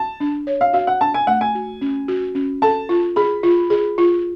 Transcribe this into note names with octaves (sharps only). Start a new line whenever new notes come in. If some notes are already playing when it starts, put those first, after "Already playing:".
Already playing: A5
D4
C#5
F5
F#4 F5
F#5
D4 A5
G#5
A3 F#5
G#5
F#4
C#4
F#4
C#4
A4 A5
F4
G#4 B5
F4
G#4
F4